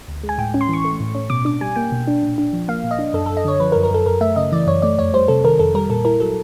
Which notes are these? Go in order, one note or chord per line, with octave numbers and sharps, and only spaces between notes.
D2
G#3
G#5
A2 G5
C#4
C6
E3
C#6
A3
A2
C#4
B2 D6
D4 D6
G3 G#5
A#3 G5
B2
D4
A#2
D4
F3
A#3 F5
A#2
D#5
D4
F#2 A4
F#2 A4
D#5
D3 C#5
F3 B4
A#4
F#2
A#4
F#2 A4
F#2 A#4
A3 E5
C#3 D#5
E3 D5
F#2 C#5
A3 D5
F2 C#5
G3 C5
C3 A4
D#3 A#4
F2 A4
G3 A#4
A#2 A4
E4 A#4
F#3 A4